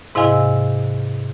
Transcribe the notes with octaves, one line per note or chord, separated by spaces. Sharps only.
G#2 C3 E4 D#5 F5 G#5